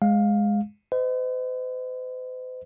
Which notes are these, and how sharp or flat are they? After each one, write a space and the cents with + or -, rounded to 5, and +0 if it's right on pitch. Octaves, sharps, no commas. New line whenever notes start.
G#3 +0 F5 +15
C5 -45 D#5 +0